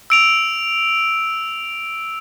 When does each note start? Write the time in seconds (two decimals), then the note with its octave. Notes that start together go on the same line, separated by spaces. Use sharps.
0.10 E6 D7 F7